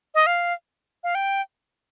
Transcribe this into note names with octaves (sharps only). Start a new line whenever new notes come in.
D#5
F5
F5
G5